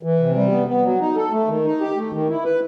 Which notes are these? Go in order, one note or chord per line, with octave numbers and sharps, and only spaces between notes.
E3
C3
G3
B3
B3
F#3
D#4
A4
A3
D#3
D#4
G4
A3
D#3
E4
B4